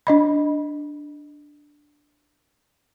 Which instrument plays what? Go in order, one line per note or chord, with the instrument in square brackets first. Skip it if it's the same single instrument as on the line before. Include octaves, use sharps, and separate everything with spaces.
[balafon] D4 D#5 B5